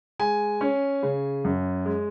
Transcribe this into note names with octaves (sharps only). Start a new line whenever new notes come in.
G#3 G#5
C#4
C#3
F#2
G#3